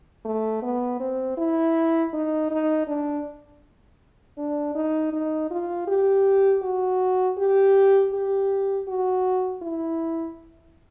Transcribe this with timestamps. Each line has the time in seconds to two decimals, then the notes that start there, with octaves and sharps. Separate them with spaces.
0.25 A3
0.62 B3
1.00 C4
1.38 E4
2.13 D#4
2.51 D#4
2.88 D4
4.38 D4
4.75 D#4
5.13 D#4
5.51 F4
5.88 G4
6.62 F#4
7.38 G4
8.13 G4
8.88 F#4
9.62 E4